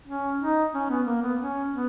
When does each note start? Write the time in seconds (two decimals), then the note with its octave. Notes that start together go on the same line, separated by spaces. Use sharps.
0.07 C#4
0.41 D#4
0.74 C#4
0.89 B3
1.06 A#3
1.22 B3
1.39 C#4
1.72 B3